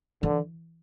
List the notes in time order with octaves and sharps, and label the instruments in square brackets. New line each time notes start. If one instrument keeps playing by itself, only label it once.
[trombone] D3 [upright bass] E3